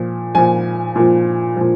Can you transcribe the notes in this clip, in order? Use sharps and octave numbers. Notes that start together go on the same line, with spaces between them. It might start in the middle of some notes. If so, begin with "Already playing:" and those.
Already playing: A#2 F3
A#2 F3 G#5
A#2 F3
A#2 F3